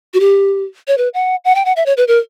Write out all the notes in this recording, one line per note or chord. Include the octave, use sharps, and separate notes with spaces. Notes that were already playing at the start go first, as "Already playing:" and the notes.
F#4
G4
C#5
B4
F#5
F#5
G5
F#5
E5
C#5
B4
A#4